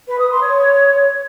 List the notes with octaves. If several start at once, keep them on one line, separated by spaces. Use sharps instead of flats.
B4
D#6
C6
C#5